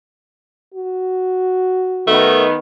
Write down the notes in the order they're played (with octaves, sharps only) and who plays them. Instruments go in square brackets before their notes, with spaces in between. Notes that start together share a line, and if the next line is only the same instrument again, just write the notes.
[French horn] F#4
[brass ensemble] D#3 B3 [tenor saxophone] A3